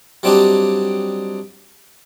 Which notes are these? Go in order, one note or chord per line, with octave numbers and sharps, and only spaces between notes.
F#3 G3 C4 D4 D#4 G4